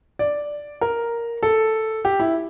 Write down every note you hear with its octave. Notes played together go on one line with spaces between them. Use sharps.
D5
A#4
A4
G4
E4